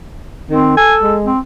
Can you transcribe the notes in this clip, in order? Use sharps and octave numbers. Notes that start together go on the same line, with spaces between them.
D#3 C4
A4 G#5
G#3
C4